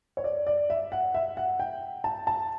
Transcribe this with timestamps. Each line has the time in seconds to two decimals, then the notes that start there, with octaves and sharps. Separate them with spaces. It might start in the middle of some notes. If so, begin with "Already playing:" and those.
0.17 C#5
0.24 D5
0.47 D5
0.70 E5
0.92 F#5
1.14 E5
1.37 F#5
1.60 G5
2.04 A5
2.27 A5